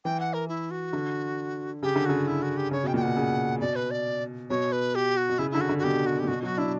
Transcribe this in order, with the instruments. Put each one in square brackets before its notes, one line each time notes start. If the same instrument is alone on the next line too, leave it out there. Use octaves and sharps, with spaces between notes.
[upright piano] E3 [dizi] G5
[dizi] F#5
A#4
E4
F#4
[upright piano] D3
[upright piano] C#3 [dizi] G4
[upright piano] D3
[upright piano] C#3 [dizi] F#4
[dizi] E4
F#4
G4
[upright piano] C#3 [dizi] C#5
[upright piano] B2 [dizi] G5
[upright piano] A#2 [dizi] G5
[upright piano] B2 [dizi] F#5
[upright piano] C#3
[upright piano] B2 [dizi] D5
[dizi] B4
D5
[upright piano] B2 [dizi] C#5
[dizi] B4
G4
F#4
[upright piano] B2
[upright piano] C#3 [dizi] E4
[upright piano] D3 [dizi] E4
[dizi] F#4
[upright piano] D3
[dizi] F#4
[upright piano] B2 [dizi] G4
[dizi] F#4
G4
[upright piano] A#2
[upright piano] B2 [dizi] F#4
[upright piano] F#3 [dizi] F#4
[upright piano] D4 [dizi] E4